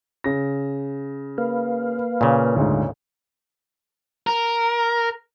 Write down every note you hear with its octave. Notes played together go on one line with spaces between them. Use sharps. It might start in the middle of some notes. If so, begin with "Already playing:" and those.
C#3 A#6
A#3 B4 F5
A#2 C#3
D2 G#2
A#4